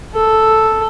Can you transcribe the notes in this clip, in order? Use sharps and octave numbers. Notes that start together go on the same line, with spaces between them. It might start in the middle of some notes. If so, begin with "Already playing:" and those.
A4